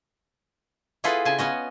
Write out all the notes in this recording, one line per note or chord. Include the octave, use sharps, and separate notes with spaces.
B3 E4 F4 G#4 A4 B4
C#3 G#5 A5
B3 C#4 D#5